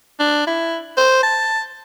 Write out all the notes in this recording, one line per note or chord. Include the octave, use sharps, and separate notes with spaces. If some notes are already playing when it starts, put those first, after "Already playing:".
D4
E4
C5
A5